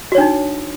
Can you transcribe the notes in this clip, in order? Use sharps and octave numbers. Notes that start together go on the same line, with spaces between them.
D4 D#4 F#4 C#5